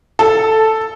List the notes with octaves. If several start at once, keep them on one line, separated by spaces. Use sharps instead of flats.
A4